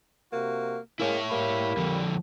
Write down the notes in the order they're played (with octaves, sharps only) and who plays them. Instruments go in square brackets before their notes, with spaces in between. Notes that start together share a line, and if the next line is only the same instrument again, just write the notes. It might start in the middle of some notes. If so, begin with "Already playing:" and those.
[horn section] C3 A#3 F#4
[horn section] G#3 A#3 C#4 [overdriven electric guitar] E4 C#5
[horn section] G3 A#3 B5
[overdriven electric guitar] F2 D3